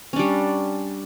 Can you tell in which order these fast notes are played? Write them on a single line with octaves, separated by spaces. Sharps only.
C#4 D4 G3